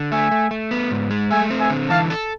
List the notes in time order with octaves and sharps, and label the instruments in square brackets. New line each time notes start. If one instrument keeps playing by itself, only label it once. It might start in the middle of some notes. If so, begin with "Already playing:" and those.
Already playing: [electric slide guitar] D3
[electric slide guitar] A3 [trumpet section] E5 G#5
[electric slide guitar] A3
A3
B3
G#2
G#3
[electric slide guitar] A3 [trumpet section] E5 G#5
[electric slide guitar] C4
[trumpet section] E5 G#5
[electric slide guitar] D3
[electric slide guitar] E3 [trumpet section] F5 A5
[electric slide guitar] A4